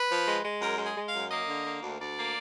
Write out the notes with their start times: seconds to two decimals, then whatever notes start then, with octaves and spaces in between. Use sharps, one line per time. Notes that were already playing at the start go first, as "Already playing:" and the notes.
Already playing: B4
0.10 F3
0.27 G#3
0.44 G#3
0.61 F#2 A#4
0.78 G#3
0.85 G#4
0.96 G#3
1.08 F5
1.14 F#2
1.30 A#3 D#5
1.48 D3
1.65 A#3
1.83 D2
2.00 D2 D5
2.16 A#3